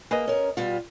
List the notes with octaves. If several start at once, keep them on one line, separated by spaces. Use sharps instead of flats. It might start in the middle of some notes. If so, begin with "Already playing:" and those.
A#3 G#4 B4 D#5
C#4 A#4
B2 G3 F4